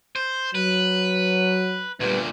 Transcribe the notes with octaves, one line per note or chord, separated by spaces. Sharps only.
C5
F#3 B4
D2 A#2 G3 B3